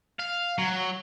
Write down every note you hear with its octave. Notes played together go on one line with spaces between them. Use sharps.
F5
F#3